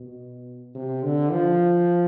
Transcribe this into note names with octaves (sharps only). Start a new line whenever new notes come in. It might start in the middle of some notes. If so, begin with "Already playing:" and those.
Already playing: B2
C3
D3
F3